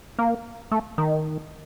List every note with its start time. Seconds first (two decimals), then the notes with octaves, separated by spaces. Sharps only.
0.19 A#3
0.72 A3
0.98 D#3